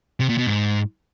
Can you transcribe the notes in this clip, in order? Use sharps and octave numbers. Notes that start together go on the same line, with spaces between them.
C3
A#2
B2
G#2